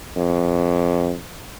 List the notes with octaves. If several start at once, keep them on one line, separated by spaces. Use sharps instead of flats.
F2